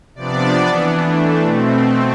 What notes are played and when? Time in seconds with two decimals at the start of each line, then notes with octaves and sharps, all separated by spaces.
0.15 C3 F3 B3 D4 D5
0.57 E3 B3 D4
1.00 E3 A3 D4
1.42 B2 A3 C4